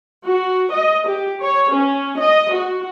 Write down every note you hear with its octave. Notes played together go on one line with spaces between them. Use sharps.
F#4
D#5
G4
C#5
C#4
D#5
F#4